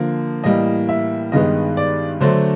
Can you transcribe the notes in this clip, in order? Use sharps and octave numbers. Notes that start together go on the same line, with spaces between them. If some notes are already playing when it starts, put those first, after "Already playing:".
Already playing: D3 F3 A#3
A2 E3 G3 A#3 D#5
E5
G2 D#3 G#3 B3 D#5
D5
D3 F#3 A3 D4 C5